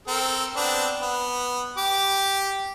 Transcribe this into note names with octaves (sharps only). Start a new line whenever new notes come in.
C4 A4 A#4
B3 C4 D4
B3
G4 D6